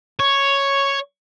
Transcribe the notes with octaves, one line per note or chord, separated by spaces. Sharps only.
C#5